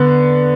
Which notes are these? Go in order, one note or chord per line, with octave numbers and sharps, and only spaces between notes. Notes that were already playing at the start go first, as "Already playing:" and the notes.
Already playing: D3 B3